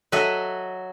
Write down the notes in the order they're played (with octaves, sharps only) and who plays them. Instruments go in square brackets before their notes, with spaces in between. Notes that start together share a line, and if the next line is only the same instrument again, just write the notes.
[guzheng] F#3 F#4 A4 D#5 E5